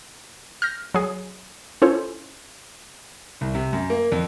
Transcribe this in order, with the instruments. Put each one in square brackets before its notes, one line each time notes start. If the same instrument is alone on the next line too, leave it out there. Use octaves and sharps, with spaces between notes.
[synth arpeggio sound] F6 G6 A#6
F#3 G#4
C#4 E4 F4 A4 C5 C#5
[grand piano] C2
C3
F#2
A#3
F2